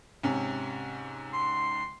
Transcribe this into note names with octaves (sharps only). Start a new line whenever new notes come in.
G#2 C3 C#4
C6